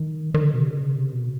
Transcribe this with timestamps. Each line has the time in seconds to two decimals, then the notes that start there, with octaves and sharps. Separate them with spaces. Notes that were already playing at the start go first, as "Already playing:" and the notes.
Already playing: D#3
0.34 D#3
0.42 D3
0.54 B2
0.61 C3
0.69 C#3
0.95 C3
1.13 B2